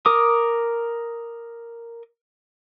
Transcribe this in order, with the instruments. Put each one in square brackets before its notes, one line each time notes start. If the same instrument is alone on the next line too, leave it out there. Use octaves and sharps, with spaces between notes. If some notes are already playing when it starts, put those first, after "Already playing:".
[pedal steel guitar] A#4 D6 D#6